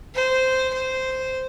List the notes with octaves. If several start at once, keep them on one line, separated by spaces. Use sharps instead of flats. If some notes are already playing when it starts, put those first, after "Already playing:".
C5
C5